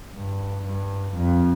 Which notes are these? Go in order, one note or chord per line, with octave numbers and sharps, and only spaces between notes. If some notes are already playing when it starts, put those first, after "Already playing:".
G2
G2
F2